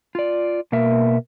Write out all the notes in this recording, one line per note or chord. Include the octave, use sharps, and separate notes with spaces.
F4 D5
B2 A#3 A#4 E5